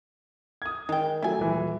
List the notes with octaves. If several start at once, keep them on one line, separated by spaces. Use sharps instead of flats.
D#6 G#6
D#3 G#3 G5
F#3 A3 E4 G#5
D#1 E3